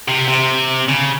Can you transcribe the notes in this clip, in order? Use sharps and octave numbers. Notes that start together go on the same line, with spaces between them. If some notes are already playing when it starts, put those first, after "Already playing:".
C3
C3
C#3